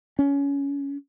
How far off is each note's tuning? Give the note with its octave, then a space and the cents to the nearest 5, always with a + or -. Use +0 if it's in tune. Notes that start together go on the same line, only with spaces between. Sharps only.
C#4 +20